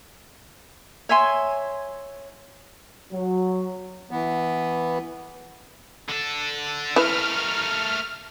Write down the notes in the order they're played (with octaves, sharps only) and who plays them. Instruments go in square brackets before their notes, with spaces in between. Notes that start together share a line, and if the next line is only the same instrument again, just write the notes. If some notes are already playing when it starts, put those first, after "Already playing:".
[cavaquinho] C#5 E5 G#5 C6
[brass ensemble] F#3
[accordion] E3 B3
[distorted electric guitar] D3 A4
[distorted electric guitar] A3 A#4 [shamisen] E4 B4 [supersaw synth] F6